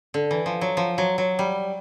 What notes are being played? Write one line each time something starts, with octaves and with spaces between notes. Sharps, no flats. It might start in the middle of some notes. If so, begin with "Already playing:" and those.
D3
E3
F3
F#3
F3
F#3
F#3
G3